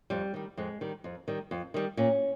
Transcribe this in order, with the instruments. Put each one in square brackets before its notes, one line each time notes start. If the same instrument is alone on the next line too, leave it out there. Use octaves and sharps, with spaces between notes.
[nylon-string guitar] F2 G3
D#3 G3
F2 G#3
D#3 G3
F2
D#3 G3
F2
D#3 G3
A#2 C#4